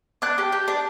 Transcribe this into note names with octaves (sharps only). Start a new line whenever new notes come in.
D4 F#6
G4
G4
D4